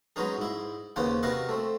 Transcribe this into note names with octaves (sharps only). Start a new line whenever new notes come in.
F#3 G#3 B3 C#4 D#4 G#4
G#2 E4
D#2 C#3 B3 C#4 C5 F#5
C3 B3 F#4 D#5 F5 C#6
A3 C4